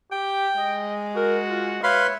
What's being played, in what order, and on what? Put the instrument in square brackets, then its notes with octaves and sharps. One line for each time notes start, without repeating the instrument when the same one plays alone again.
[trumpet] G4 [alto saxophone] G5
[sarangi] G#3 [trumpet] D#5
[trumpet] F#4 [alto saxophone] A#4
[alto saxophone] F4
[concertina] B4 B5 C6 [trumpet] C#5 [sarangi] E5 [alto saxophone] F5